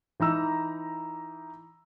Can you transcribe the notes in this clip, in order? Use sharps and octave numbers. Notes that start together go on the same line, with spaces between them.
E3 D#4 A#5 E6